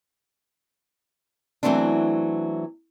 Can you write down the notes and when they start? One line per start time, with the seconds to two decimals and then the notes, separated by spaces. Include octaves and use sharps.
1.63 E3 F#3 A3 B3 C4 D4